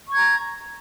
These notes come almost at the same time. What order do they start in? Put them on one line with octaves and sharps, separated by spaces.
C#6 G#6 A#5